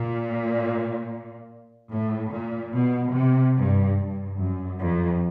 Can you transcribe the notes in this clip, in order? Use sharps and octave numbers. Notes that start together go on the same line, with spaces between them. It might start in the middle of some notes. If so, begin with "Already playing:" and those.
Already playing: A#2
A2
A#2
B2
C3
G2
G2
F#2
F2